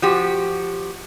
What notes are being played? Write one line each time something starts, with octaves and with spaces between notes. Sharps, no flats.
F3 F#4 G4